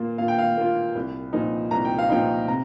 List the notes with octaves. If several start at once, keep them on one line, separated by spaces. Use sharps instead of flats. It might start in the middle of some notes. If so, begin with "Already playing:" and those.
Already playing: A#2 A#3 F4
A#2 F5
G5
F5
A#3 F4
C2
A#2 F3 D#4
C2 A#5
G5
F5
A#2 F3 D#4 G5
C3 A#5